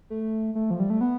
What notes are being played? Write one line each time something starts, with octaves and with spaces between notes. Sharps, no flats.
A3
A3
F3
G3
A3
B3